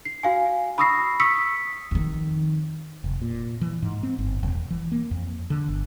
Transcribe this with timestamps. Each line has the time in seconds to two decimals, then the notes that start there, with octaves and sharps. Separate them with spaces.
0.05 C7
0.23 F#4 F5 G#5
0.78 B5 C#6 D#6 E6 A#6 C7
1.20 C#6 D#6 E6 B6 C#7
1.91 F2 D#3
3.04 F1
3.22 A#2
3.61 E3
3.82 G#2
4.03 C4
4.18 G1
4.43 E1
4.70 E3
4.92 A#3
5.11 F2
5.50 D3
5.69 G1